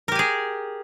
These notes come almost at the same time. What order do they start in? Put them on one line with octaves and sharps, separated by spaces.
A#4 G4 G#5 G#4